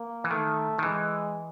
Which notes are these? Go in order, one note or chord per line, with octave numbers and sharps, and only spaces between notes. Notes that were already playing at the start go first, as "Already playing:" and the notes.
Already playing: A#3
E3
D#3 A3
D#3
E3 G#3